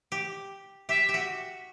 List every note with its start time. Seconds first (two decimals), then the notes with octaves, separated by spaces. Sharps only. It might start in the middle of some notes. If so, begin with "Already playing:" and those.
0.12 G4
0.89 G4 E5
1.09 G4
1.14 F#4